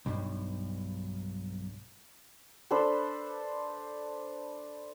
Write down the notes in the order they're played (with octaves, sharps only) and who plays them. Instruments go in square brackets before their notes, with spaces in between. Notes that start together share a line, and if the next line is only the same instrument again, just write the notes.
[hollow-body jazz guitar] B1 G2
[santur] D4 A4 B4 C5